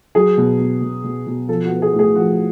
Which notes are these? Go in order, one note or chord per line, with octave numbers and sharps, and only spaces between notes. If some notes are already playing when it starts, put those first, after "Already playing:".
F#3 G#4
B2
B2
B2
B2
B2
F3 A4
F#4
B3
G#4
A2
G#4
F3 F#4